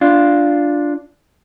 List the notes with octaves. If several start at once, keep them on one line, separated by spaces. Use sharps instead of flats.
D4 F4